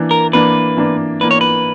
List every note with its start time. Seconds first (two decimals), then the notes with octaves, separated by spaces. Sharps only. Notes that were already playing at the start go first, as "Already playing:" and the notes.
Already playing: E3 A#3 D4
0.11 A#4
0.33 E3 A#3 D4 B4
0.77 E3 A#3 D4
1.21 E3 A#3 D4 B4
1.31 C#5
1.41 B4